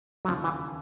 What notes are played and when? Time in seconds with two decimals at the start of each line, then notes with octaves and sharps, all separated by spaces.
0.25 F#3
0.28 E1 D#2 C#3 F3
0.44 E3